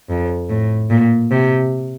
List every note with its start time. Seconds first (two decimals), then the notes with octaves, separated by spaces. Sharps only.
0.10 F2
0.50 A2
0.90 A#2
1.31 C3